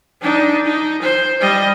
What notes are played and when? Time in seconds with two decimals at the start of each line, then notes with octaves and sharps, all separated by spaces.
0.22 D4 D#4
0.65 D#4
1.02 C5
1.41 G3 D#5